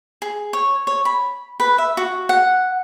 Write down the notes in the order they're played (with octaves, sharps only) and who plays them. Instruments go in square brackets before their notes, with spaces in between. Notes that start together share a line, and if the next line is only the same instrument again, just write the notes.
[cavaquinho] G#4
C#5
C#5
B5
B4
E5
F#4
F#5